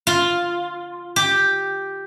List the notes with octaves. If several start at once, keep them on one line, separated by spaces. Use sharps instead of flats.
F4
G4